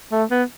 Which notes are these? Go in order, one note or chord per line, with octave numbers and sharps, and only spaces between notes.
A3
B3